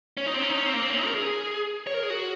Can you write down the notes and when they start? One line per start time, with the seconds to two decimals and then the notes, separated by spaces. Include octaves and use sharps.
0.17 C#4
0.26 D#4
0.34 C4
0.42 C#4
0.50 D#4
0.58 C#4
0.66 C4
0.74 A#3
0.82 C4
0.90 C#4
0.98 D#4
1.06 A#4
1.14 G#4
1.87 C#5
1.94 A#4
2.03 G#4
2.10 F#4